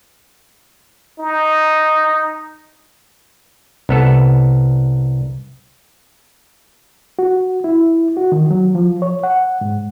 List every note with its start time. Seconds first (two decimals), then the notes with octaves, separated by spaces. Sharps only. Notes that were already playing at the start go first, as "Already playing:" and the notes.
1.20 D#4
3.89 C2 B3 A4
7.19 F#4
7.64 E4
8.17 F#4
8.32 D#3
8.51 F#3
8.75 F3
9.02 C#5
9.23 F#5
9.61 G#2